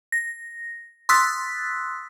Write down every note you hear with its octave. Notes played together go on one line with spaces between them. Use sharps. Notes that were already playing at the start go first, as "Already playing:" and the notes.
A#6
C6 D#6 E6 F#6 A6 B6